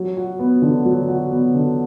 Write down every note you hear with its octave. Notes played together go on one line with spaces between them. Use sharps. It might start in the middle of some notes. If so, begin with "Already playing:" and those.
Already playing: F#3
F#4
B3
D3
F#3
F#4
B3
D3